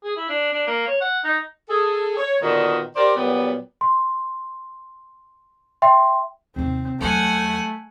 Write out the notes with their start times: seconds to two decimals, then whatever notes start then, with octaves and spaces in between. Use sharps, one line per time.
0.03 G#4
0.16 E4
0.29 D4
0.53 D4
0.67 A#3
0.87 C#5
1.01 F#5
1.24 D#4
1.69 G#4 A4
2.17 C#5
2.42 A#2 D3 D#3 B3 F4 F#4
2.96 G4 A#4 C5 D5
3.16 A#2 F#3 G3 B3
3.81 C6
5.82 E5 G5 C6
6.56 D#2 C3 C4
7.00 E2 F#3 A3 F#5 G#5